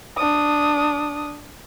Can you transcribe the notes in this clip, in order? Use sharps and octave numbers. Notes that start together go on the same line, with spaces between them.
D4 D#6